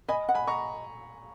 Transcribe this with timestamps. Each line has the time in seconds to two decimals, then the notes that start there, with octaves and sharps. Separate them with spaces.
0.08 D#5 G#5 B5
0.29 F#5
0.34 G#5 B5
0.47 D#5 A#5 C#6